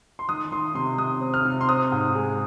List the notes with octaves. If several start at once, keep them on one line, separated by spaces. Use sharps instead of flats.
C6
D#3 D#6
D#3 C6
C3 C6
C3 D#6
C4
F6
C3
C6
C4 D#6
G#2
G#3